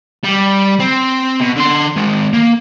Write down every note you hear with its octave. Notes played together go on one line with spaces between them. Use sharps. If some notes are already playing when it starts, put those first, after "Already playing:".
G3
C4
B2
D3 C6
D#3 G#3
A#3